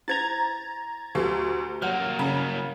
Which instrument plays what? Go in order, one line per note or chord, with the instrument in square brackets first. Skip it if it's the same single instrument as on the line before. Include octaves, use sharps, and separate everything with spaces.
[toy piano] E4 C5 [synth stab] A#5 G#6 A6
[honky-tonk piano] D2 [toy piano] G4 A4
[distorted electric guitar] F#3 A#3 [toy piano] C#5 D5 F#5 [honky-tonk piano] F6
[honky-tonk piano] C#3 [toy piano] A#5